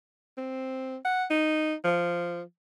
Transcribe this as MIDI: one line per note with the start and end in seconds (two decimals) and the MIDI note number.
0.37 0.97 60
1.05 1.24 78
1.30 1.75 63
1.84 2.42 53